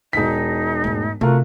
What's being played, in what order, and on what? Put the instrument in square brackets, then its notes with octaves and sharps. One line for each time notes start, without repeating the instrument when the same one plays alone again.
[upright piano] E1 B6 [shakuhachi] D#4
[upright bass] G#2 A3
[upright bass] C3 [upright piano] A3 F4 A#4 [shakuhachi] F#4